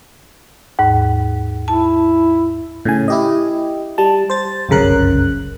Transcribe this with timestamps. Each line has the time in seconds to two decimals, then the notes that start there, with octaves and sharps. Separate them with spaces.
0.79 D#2 G#2
1.68 E4 A5
2.85 A2 C#3 G#5
3.08 E4 G4 D#5
3.98 G3 A5
4.30 C5 A6
4.69 G1 C2 F#2 C#3 A#4 F#6